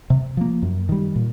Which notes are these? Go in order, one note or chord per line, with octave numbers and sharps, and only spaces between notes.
C3
F3 A#3
F#2
D#3 G3
A#2